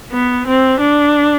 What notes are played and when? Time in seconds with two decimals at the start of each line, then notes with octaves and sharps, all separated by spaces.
0.12 B3
0.47 C4
0.80 D4